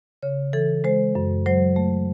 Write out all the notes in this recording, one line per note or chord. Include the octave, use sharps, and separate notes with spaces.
C#3 C#5
E3 A4
G#3 C5
F#2
F#3 C5
A3